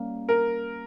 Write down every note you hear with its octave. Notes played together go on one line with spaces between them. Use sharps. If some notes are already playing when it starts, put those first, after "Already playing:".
Already playing: G3 A#3 C#4
A#4